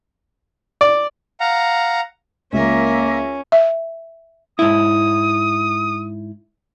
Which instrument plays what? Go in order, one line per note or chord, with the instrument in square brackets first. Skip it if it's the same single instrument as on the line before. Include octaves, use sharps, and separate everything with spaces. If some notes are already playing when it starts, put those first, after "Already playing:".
[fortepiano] D5
[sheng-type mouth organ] F5 F#5 A#5
[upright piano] C#2 [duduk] A#3 [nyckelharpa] C#4 [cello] A#4 E5
[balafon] E5
[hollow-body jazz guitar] G#2 E4 [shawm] D#6